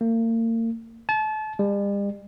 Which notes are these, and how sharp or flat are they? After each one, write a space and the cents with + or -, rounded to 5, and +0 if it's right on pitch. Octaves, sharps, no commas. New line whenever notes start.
A#3 -40
A5 -30
G3 +45